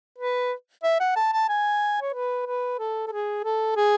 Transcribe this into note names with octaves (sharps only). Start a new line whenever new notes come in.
B4
E5
F#5
A5
A5
G#5
C#5
B4
B4
A4
A4
G#4
A4
G#4